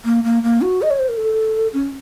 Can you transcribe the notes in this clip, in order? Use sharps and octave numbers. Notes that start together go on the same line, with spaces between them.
A#3
A#3
A#3
F#4
D#5
C#5
C5
A#4
A4
C#4